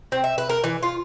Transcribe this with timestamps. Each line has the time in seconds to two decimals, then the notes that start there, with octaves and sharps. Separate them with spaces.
0.12 C4
0.24 E5
0.38 B4
0.49 A#4
0.64 E3
0.83 F4